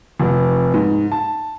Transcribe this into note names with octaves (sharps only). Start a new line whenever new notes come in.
F1
G#2
A5